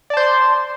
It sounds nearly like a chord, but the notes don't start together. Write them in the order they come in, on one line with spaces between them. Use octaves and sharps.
D5 A5 C5 C6